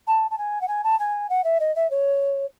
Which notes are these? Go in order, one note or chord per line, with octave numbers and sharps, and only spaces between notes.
A5
A5
G#5
F#5
G#5
A5
G#5
F#5
E5
D#5
E5
C#5